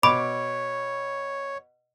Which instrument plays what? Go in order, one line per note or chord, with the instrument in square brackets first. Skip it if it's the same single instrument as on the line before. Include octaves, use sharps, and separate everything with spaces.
[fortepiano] B2 [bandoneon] C#5 [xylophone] B5 [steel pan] D6